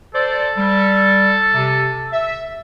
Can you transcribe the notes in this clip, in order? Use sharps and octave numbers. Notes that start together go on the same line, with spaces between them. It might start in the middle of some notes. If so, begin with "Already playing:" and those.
A4 C5 D5
G3
C3
E5